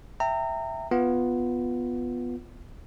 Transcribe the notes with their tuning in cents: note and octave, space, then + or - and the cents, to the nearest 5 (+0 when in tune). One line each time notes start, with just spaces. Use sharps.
E5 +0 G5 +0 A#5 -30
B3 +0 F4 +5